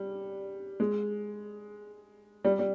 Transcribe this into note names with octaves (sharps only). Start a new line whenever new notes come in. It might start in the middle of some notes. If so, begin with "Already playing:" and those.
Already playing: G3
G#3
G3
G3